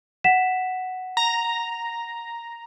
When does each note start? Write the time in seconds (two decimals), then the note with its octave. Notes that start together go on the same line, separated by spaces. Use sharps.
0.24 F#5 B6 E7
1.17 A#5